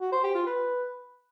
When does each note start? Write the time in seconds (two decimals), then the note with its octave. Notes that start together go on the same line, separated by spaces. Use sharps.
0.01 F#4
0.12 C5
0.24 G4
0.35 F4
0.46 B4